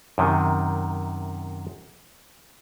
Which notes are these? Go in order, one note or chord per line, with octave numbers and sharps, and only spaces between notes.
F#2 C3 D#3